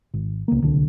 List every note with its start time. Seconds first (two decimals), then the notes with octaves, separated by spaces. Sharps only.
0.14 G#1
0.48 C#2 A#3
0.62 D1 C2 D3